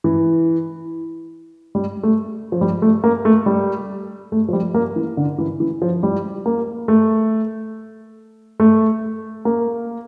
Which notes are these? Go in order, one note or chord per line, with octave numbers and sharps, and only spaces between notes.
E3
G3
A3
F3
G3
A3
A#3
A3
G3
A3
F3
G3
A#3
E3
D3
E3
E3
F3
G3
A#3
A3
A3
A#3